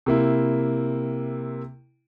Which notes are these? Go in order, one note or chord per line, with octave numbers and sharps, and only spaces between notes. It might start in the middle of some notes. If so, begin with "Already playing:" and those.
C3 A#3 E4